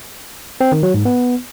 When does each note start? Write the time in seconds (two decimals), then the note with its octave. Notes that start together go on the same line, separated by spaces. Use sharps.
0.61 C4
0.72 D#3
0.83 F#3
0.94 G#2
1.05 B3